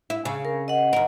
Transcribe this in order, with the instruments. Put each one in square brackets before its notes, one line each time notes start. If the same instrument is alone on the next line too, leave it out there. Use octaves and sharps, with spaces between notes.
[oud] E4
C#3
[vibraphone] A#4
D#5 F#5
[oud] D#2 A#4